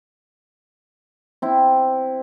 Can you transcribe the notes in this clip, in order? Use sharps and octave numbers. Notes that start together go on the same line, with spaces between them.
C4 E4